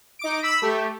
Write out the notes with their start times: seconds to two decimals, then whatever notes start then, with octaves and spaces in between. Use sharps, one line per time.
0.19 D#4 D6 D7
0.42 B5 E6 B6
0.62 A3 G4